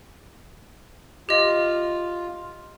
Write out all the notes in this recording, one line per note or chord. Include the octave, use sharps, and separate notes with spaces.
F4 G4 D#5